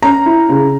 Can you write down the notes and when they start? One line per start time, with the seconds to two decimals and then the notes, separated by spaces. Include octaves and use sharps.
0.02 C#4 A#5
0.26 E4
0.49 C#3